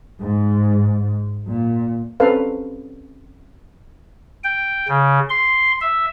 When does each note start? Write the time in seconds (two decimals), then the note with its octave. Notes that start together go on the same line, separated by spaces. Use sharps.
0.21 G#2
1.47 A#2
2.20 C4 C#4 A4 B4 F5
4.44 G5
4.88 C#3
5.29 C6
5.81 E5